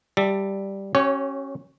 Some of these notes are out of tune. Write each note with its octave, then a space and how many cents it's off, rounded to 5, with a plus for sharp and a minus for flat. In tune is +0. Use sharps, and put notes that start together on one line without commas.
G3 +0 E5 +0 A5 +25
C#4 -20 G4 -40 C#5 +0